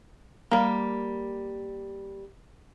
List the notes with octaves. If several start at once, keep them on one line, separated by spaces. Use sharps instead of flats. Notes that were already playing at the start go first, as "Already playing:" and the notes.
G3 A#3